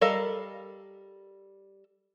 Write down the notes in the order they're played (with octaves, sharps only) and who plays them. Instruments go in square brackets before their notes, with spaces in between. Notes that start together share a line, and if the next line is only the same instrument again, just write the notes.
[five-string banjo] G3 A4 A#4 D#5 F5